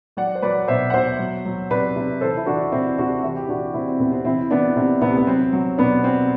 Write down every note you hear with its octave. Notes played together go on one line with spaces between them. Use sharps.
F#3 D5 F#5
C5
F#3 B4 D5
B2 C5 E5
F#5
B2 C5 E5
F#3
F#3
C3 B4 D5
C3
E3 A4 C5
E4
E3 D4 F#4
C3 C4 E4
C3 D4 F#4
E3 E4 G4
G4
E3 D4 F#4
C3 C4 E4
C4
C3 B3
C4
E3 C4 E4
E3 B3 D4
C3 C4
C3 B3
B3
F#3 C4
F#3
B2 B3 D4
B2 C4